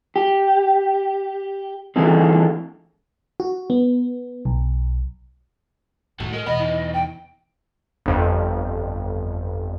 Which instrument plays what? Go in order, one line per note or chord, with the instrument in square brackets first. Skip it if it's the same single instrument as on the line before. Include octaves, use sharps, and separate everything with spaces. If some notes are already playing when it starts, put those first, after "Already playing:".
[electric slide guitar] G4
D3 E3 G#3 A#3 C4
[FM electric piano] F#4
B3
B1
[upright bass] A2 [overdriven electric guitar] D#3 F#4
[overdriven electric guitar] G#3 [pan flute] A#4
[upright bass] E2 B2 [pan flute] D#5 [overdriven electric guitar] F#5 B5
[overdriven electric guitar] D#3 E4
[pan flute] G5
[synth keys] G1 F2